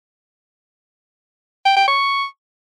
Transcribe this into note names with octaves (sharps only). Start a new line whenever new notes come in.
G5
G5
C#6